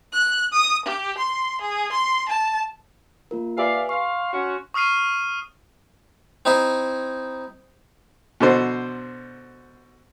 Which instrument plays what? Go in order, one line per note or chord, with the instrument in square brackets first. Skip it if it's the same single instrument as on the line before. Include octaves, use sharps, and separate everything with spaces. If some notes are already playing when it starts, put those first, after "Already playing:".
[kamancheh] F#6
D#6
G4
C6
G#4
C6
A5
[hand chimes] A#3 F4 A#4
[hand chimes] G4 B4 G#5 [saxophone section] D5 E5 F5
[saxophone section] F5 [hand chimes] C6 C#6
[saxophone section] C#4 F#4
[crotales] C#6 D#6 F6 C7 D#7
[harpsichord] C4 D#4 E4 C5
[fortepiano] B2 D3 C5